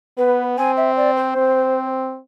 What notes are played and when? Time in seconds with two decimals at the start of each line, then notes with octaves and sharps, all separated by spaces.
0.18 B3 B4
0.58 C4 G#5
0.77 E5
0.97 D5
1.17 C5
1.36 C4